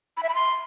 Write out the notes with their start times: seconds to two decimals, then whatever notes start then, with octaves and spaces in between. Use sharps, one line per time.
0.17 B5
0.23 E5
0.29 B5
0.35 C6